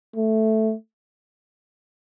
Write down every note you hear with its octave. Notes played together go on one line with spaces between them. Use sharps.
A3